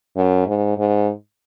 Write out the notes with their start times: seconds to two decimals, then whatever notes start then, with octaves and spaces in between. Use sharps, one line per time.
0.16 F#2
0.47 G#2
0.78 G#2